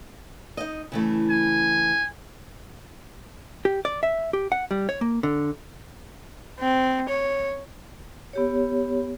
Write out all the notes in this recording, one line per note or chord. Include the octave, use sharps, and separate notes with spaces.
D#4 D#5
C#3 E3 A3
G#5
G4
D5
E5
G4
F#5
G3
C#5
A#3
D3
C4
C#5
B3 G4 C#5